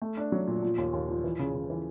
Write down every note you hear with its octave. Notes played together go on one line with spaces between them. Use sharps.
A3
D4
F#3
A#2
F3
D#2
D#2
F3
E3
C#3
C#3
E3